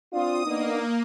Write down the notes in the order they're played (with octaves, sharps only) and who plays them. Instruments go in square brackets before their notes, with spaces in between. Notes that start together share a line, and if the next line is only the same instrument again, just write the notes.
[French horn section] C4 D4 F4 [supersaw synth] D#6
[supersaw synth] A#3 [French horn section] B3 D4 D#4